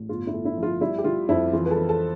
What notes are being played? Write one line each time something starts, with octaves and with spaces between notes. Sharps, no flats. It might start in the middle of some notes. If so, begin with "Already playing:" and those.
Already playing: A1
G1 F4
E4
A3
E4
F3
F4
G3 E4
G4
G3 F4
F2 E4
E3 F4
B4
A4
E3
A4